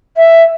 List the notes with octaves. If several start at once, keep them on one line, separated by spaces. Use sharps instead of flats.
E5